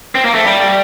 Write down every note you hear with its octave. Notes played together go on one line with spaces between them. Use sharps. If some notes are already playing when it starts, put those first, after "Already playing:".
C4
A#3
A3
G3